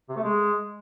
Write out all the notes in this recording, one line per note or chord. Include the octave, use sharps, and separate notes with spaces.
C3
A3
G#3